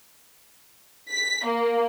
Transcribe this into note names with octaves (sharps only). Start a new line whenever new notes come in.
B6
A#3